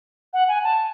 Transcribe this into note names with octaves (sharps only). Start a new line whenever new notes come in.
F#5
G#5
A5